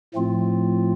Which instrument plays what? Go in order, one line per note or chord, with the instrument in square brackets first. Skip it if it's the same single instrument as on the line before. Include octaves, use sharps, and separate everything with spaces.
[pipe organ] A2 F3 A3 C4 F4